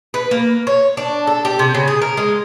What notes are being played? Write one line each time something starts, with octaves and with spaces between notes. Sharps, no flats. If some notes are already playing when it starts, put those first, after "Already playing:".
B4
A#3
C#5
D4
A4
G4
C3
C#3
G#4
A#4
G#3